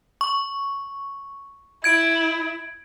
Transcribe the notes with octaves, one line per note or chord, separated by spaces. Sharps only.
C#6
E4 G#6 D7